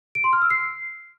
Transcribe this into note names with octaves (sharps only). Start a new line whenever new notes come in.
D7
C6
F6
E6
C7